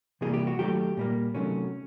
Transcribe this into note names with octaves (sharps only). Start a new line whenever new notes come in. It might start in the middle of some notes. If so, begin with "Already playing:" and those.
C3 E3 G3 A#3 G#4
G4
F#4
D#3 F#3 A3 G4
A#2 G3 A#3
C3 D#3 F#3 A3 C#4